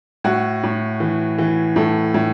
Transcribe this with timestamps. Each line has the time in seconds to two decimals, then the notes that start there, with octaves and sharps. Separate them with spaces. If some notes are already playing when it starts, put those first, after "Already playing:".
0.24 A2 F#4
0.63 A2
1.00 E3
1.38 E3
1.76 A2 A4
2.14 A2